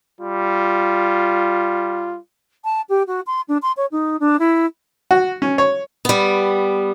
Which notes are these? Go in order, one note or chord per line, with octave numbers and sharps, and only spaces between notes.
G3 F4
A5
G4
F#4
C6
D4
C6
C#5
D#4
D4
E4
F#4
C#4
C#5
G3 B3